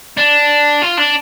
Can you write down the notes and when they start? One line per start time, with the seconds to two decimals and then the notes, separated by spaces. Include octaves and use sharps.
0.17 D4
0.82 F4
0.97 D4